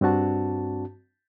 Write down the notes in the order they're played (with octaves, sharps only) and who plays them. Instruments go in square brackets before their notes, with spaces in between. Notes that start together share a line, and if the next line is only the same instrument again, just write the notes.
[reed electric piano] G2 C4 D4 F#4 A5